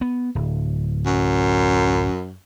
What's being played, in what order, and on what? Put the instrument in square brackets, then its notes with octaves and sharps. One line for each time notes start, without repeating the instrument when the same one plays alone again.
[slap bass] B3
D1
[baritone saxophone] F#2